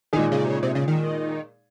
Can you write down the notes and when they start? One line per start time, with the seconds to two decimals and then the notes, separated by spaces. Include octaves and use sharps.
0.13 A#2 D#3 G#3 D#4 G#4
0.32 C#3
0.45 C3
0.50 C#3
0.63 C3
0.75 C#3
0.88 D#3